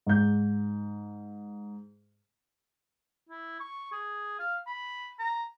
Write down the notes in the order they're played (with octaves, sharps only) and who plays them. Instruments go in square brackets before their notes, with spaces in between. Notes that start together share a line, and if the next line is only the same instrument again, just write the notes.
[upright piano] G#2 G6
[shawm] E4
C#6
G#4
F5
B5
A#5